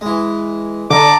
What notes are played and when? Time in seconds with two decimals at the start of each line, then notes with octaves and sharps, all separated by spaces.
0.01 E3 G#3
0.90 D3 D#5 A5 A#5 D6